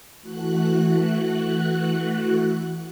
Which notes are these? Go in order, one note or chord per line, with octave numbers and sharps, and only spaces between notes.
E3 A3 F#4 F#6